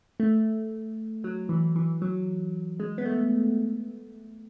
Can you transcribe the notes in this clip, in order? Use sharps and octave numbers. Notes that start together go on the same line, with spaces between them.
A3
F#3
E3
E3
F#3
G#3
B3
A3